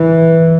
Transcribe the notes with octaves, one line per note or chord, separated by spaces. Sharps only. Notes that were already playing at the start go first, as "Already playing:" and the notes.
Already playing: E3